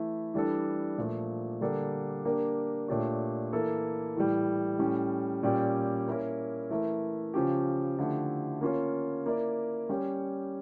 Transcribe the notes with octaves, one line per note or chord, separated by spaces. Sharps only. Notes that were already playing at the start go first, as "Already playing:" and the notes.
Already playing: E3 A3 E4
E3 G3 D4 A4
A#2 F3 A3
D3 G3 A#3 D4 A4
A#3 D4 G4 A#4
A#2 A3 D4 G4 C#5
E3 A#3 E4 A4
A2 E3 G3
A2 G3 C#4
A#2 G3 C#4 G4 D5
A#3 C#4 E4 A#4 C#5
E3 A3 E4 A#4
C#3 F3 C#4 G4
D3 F3 A3 E4 G4
A#3 C#4 F4 C#5
A#3 E4 A#4 D5
G3 C#4 G4 C#5